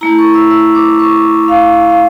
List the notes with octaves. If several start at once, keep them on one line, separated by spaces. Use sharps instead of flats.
A3 E4 A#5
C#6
E6
E6
D6
C#6
F5
F5